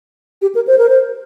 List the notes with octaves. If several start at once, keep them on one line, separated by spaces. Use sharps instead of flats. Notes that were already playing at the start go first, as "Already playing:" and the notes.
G4
A#4
C5
A#4
C5